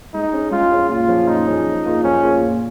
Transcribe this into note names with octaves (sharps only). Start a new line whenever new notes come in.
G#3 D#4
C#4 G#4
G#3 F4
C#4 G#4
A#2 F4
F3 C#4 G#4
A#2 D#4
F3 C#4 G#4
F3
A#3 F4 G#4
F3 C#4
A#3 F4 G#4
A#2